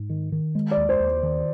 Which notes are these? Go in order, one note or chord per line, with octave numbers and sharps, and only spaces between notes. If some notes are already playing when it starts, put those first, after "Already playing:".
Already playing: G#2
D#3
D#3
G#3
D5
D#2
C5
D#2
D#3